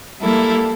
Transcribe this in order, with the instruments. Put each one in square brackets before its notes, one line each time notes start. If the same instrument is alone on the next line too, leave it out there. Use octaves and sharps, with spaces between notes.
[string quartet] G3 A#3 E4 A4